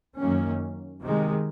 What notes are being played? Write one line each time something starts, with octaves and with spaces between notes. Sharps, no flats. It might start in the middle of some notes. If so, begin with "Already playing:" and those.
F#2 D#3 F#3 A#3 C#4
C3 D#3 G#3